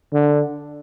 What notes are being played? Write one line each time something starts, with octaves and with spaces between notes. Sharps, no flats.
D3